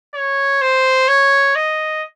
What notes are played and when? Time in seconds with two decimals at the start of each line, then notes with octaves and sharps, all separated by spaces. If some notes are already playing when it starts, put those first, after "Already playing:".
0.15 C#5
0.62 C5
1.08 C#5
1.56 D#5